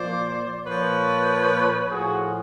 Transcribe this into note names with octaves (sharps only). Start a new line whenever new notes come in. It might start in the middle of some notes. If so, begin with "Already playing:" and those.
Already playing: A#2 F3 C5 D5
A#2 F3 B4 C#5
A2 F3 F#4 G#4